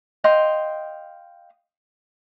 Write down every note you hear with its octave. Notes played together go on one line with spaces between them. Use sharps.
D#5 F5 G5 C6